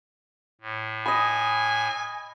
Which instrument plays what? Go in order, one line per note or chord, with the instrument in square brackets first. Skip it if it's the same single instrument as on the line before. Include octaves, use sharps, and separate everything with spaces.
[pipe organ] A2
[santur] D#5 B5 [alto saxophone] G#5